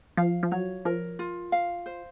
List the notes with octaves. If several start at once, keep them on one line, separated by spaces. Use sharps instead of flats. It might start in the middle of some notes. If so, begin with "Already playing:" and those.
F3 F5
F3
F#3 C#5
F3 A#4
F4
F5
C5